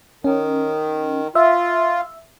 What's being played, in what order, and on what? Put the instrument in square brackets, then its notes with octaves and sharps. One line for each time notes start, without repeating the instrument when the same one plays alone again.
[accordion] D#3 [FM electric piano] C#4
[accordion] F4 [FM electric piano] E5